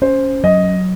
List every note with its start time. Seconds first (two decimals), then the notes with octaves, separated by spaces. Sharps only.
0.02 C#4 C5
0.44 F#3 D#5